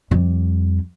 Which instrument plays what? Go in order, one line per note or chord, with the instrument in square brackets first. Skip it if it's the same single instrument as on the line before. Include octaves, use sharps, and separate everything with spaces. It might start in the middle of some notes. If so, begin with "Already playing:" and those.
[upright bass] F2 G3